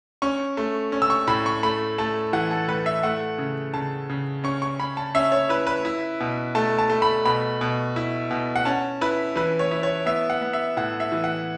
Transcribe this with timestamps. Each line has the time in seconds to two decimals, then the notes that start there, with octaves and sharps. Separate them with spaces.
0.22 C#4 C#6
0.57 A3
0.92 C#4
1.02 E6
1.10 C#6
1.27 A2 B5
1.46 C#6
1.63 A3 B5
1.98 A3 A5
2.33 E3 F#5
2.51 A4
2.68 A2 B4
2.86 E5
3.03 A3 F#5
3.38 C#3
3.74 C#3 A5
4.10 C#3
4.44 C#4 C#6
4.62 C#6
4.80 C#4 B5
4.97 A5
5.15 C#4 E5
5.32 C#5
5.49 E4 B4
5.67 B4
5.85 E4
6.20 B2
6.55 A3 A5
6.78 A5
6.90 A3
7.02 B5
7.25 B2 B5
7.61 B2
7.96 E4
8.31 B2
8.56 F#5
8.65 C#4 A5
9.01 E4 B4
9.36 E3 B4
9.59 C#5
9.71 E4
9.83 C#5
10.06 B3 E5
10.30 F#5
10.42 B3
10.53 E5
10.77 A2 F#5
11.00 E5
11.12 E3
11.24 F#5